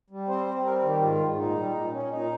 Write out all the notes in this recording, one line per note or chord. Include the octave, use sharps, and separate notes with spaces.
G3
C4 C5
C4
G3 A#4
D#3
G4
G#2 F4
G#2
A#2 D#4
G3
A#2
C#4
A#2 D#4